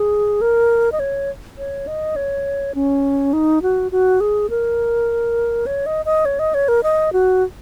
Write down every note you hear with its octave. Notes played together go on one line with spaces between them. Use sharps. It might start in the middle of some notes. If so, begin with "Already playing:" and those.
Already playing: G#4
A#4
D#5
C#5
C#5
D#5
C#5
C#4
D#4
F#4
F#4
G#4
A#4
C#5
D#5
D#5
C#5
D#5
C#5
A#4
D#5
F#4